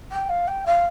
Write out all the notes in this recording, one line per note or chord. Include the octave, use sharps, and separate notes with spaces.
G5
F5
G5
F5